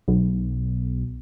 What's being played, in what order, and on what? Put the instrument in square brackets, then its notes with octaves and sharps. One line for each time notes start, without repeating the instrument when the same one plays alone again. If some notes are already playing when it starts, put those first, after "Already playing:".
[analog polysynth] B1